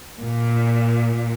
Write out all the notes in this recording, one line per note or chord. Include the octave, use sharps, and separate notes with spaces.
A#2